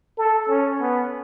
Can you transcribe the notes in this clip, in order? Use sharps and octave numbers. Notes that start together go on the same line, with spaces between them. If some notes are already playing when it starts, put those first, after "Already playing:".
A4
C#4
B3